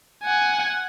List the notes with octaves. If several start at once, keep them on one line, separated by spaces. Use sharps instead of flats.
F#5 G#5